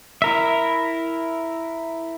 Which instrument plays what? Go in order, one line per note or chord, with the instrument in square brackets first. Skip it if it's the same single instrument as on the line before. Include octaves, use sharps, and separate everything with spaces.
[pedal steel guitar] E4 A#4 E5